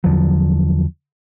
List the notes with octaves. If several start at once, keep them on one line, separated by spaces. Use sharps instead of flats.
E2 D3 F3 F#3